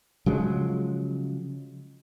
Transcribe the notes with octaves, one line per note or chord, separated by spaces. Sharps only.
C#3 F3 F#3 G#3